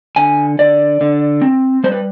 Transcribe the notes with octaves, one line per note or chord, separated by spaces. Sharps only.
D3 G#5
D3 D5
D3
C4
G3 C5
B4